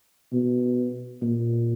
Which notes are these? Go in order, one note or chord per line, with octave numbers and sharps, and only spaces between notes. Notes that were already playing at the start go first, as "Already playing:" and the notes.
B2
A#2